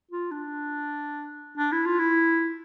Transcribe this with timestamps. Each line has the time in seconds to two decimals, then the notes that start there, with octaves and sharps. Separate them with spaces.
0.11 F4
0.31 D4
1.58 D4
1.72 E4
1.86 F4
1.99 E4